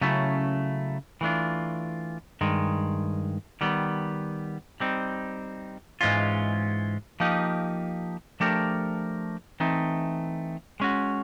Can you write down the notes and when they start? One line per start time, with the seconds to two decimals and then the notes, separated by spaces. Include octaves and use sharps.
0.01 C#3 F#3 A3 C#4 E4
1.21 E3 A3 D4 F4
2.41 G2 D#3 G#3
3.61 D#3 G3 B3
4.80 G3 C4 D#4
6.01 G#2 E3 G#3 C#4 F4
7.20 F3 A#3 D#4 G4
8.40 F3 A3 D4 G4 A#4
9.60 E3 A3 C4 D#4
10.80 G#3 C#4 F#4